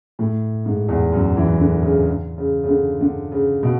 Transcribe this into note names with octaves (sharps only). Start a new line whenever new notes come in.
A2
G#2
E2
F#2
E3
D3
C#3
C#3
C#3
D3
D3
C#3
B2